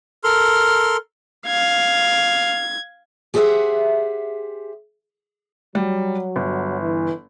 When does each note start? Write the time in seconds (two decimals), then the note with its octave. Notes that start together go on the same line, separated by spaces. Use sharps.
0.24 A4 A#4 C6 F6
1.47 F5 G#6
3.34 G4 G#4 C5 D5 E5 F#5
5.75 F#3 G3
6.36 G1
6.81 E3